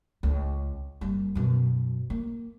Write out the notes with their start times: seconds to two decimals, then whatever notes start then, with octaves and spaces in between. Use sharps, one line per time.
0.23 C#2
1.01 F#1 G3
1.35 F#2 B2
2.10 A#3